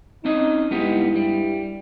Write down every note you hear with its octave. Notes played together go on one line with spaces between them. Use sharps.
C4 C#4 D#4 D#5
G2 G#3 B3 E4 G4
G3